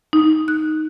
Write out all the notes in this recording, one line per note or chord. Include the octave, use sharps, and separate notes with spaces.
D#4
F#6